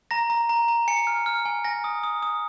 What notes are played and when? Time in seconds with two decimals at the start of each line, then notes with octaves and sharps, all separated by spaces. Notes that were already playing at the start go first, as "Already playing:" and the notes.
0.11 A#5 A#6
0.30 A#5
0.49 A#5
0.68 A#5
0.88 G#5 C#7
1.07 F6
1.26 F6
1.45 G#5
1.64 G#5 A#6
1.84 D#6
2.04 D#6
2.22 D#6